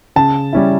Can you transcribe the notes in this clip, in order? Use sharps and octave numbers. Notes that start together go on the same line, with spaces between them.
C#3 A5
G3 C#4 E4